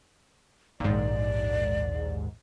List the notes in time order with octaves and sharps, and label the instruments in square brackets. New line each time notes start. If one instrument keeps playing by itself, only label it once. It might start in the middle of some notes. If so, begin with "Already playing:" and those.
[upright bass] A#1 [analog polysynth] D#2 G#2 [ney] D5